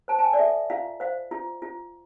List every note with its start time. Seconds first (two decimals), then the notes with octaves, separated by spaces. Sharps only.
0.08 C5 A5
0.19 A5
0.24 G#5
0.33 D5
0.39 A4 E5
0.70 F4 F5
1.00 C5 F5
1.31 F4
1.62 F4